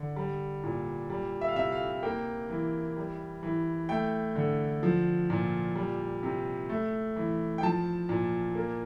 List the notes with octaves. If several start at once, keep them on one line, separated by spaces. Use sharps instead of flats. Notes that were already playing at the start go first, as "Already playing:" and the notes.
Already playing: D3
G3
A#2
G3
E5
F5
C3 E5
F5
A#3 G5
E3
G3
E3
A3 G5
D3
F3
A#2
G3
C3
A3
E3
G5
F3 A5
A#2
A#3